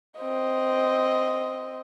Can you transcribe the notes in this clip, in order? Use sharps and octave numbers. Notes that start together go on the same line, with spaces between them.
C4 D#5